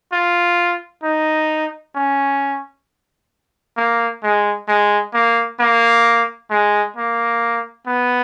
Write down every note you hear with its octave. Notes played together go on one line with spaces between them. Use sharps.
F4
D#4
C#4
A#3
G#3
G#3
A#3
A#3
G#3
A#3
B3